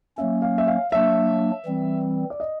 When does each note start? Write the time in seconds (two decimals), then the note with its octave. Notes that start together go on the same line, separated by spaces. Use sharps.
0.17 F#3 A#3 C#4 E5
0.42 F5
0.58 E5
0.67 F5
0.92 F#3 A#3 D4 E5
1.65 E3 G3 C4
2.30 D5
2.40 D#5